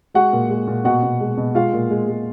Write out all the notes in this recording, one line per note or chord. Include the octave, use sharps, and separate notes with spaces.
G#3 F#4 F#5
A#2
G#3
A#2
B2 F#4 F#5
B2
G#3
B2
G#3 F4 F5
A#2
G#3
G#3